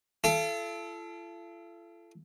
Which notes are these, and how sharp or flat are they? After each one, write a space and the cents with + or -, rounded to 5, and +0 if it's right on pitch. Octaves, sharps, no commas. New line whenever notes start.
F4 -45 A4 -15